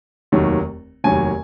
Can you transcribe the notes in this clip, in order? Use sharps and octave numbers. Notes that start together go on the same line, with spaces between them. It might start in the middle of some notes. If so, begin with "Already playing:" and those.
F1 D#2 D#3 F#3
F1 D#2 D#3 F#3 G#5